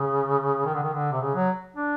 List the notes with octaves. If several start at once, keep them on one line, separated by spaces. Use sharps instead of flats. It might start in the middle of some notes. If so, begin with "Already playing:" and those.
Already playing: C#3
D#3
D3
D#3
D3
C3
C#3
F#3
D4